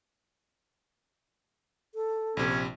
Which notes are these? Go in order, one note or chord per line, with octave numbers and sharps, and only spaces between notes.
A4
A#1 C3 C#4